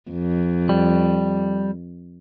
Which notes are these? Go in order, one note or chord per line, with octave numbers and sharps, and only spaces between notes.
F2
G3